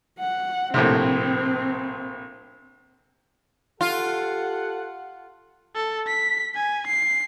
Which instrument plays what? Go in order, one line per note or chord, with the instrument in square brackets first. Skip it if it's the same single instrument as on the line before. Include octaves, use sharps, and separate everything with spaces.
[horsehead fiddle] F#5
[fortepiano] A#1 A2 C3 [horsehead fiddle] C4
[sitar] F4 [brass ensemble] G4 A4 F#5
[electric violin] A4
B6
G#5
C7